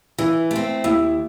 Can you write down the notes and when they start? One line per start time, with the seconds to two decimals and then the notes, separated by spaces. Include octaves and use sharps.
0.18 E3 E4
0.51 A3 C4
0.84 D#2 E4